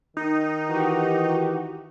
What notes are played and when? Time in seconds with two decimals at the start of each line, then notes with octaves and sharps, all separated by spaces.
0.17 D#3 D#4
0.69 E3 F#4 G4